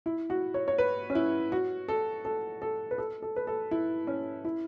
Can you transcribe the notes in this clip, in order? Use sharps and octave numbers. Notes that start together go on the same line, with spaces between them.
E4
F#4
C#5
C#5
B4
C#4
E4
F#4
A4
A4
A4
B4
A4
A4
B4
A4
E4
C#4
E4